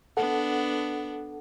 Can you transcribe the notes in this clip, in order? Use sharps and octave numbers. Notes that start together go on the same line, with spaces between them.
B3 D4 A4 F#5